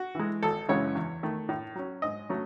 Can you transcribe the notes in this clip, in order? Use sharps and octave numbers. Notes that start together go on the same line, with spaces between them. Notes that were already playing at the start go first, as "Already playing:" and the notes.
Already playing: F#4
E3 G#3
G#1 A4
F#2 C#3 E3 G#3 C#5
E2
D#3 A3
A2
F#3 C#4
G#2 D#5
F#3 A3 C#4